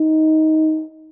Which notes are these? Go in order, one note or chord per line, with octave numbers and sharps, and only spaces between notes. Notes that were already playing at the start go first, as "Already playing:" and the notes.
Already playing: D#4